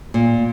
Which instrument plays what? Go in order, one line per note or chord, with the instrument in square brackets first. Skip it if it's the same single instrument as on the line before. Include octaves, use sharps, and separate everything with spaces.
[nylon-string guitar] A#2